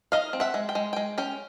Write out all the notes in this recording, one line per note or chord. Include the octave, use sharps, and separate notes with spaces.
D#4 D#5 F5
C4
E5 F#5
G#3
G5
G#3
G#3 G5
C#4 G5